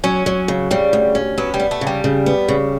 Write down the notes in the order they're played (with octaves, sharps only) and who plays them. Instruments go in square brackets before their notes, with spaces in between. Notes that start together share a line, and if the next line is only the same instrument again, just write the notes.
[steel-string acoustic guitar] F#3 [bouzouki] C#4
[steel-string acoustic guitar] F#3
C#3
[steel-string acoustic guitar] C#3 [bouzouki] G3
[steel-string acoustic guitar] D2
C#4
[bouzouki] F#3 [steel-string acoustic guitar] B3
[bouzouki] G3
[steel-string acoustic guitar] B3
[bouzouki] A3
[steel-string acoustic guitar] C#3
[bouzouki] G3
[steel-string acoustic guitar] C#3
B3
C#3